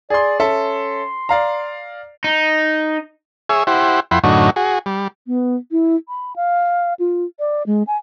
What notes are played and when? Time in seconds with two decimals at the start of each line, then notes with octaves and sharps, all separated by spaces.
0.10 G#4 D5 C6
0.40 C#4 A4 E5 C6
1.29 D5 F5 A#5
2.24 D#4
3.49 G#4 C#5 E5
3.67 E4 G4 C5 F#5
4.11 F2 E4 F#5 G5 B5 C6
4.24 F#2 A2 D3 D#4 F#4 C#5
4.56 F#4 G#4
4.86 G3
5.27 B3
5.71 E4
6.08 B5
6.36 F5
6.99 F4
7.39 D5
7.66 G#3
7.87 G#5